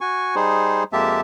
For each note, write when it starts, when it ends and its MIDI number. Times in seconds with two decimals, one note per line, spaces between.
0.01 0.35 66
0.01 0.35 80
0.01 0.35 85
0.35 0.84 55
0.35 0.84 63
0.35 0.84 68
0.35 0.84 72
0.93 1.21 41
0.93 1.21 56
0.93 1.21 58
0.93 1.21 67
0.93 1.21 76
0.93 1.21 81